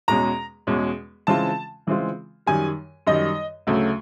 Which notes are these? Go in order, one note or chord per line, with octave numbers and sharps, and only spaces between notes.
E2 B2 G#3 C#4 A#5
E2 B2 G#3 C#4
C#3 E3 G#3 C4 F4 A5
C#3 E3 G#3 C4 F4
F#2 D#3 G3 G#5
F#2 D#3 G3 D#5
D2 C#3 F#3 A3